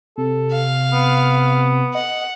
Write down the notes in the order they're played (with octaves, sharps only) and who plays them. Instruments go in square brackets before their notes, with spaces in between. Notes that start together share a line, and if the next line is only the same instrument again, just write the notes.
[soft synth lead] C3 [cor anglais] A4
[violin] F5
[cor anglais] B3
[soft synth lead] D#5 [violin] F#5